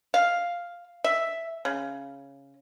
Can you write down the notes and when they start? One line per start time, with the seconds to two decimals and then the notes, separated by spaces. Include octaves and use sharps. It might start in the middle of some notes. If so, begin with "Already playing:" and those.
0.14 F5
1.04 E5
1.65 C#3